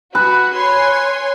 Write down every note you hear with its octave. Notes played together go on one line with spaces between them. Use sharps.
F#4 B4
C#5 G#5 C6